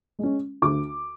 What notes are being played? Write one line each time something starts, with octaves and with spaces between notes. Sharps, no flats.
G#3 C#4
D2 D6